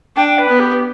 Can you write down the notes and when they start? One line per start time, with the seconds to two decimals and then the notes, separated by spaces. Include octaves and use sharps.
0.16 D4 G5
0.38 B4
0.49 B3
0.60 G4